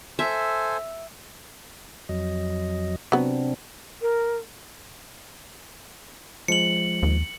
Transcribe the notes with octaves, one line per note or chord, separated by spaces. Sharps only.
A4 C5 E5 G#5
F2 F#3 D#5
C3 F#3 B3 C4 D4
A#4
F3 G#3 C#7 F#7
D#2